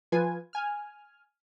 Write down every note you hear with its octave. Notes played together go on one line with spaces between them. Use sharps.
F3 F4 B4 G#5 G#6
G#5 F6